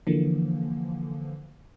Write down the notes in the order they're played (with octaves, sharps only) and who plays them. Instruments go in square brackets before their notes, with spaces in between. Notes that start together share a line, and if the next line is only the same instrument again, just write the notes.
[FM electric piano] D3 E3 F3 A#3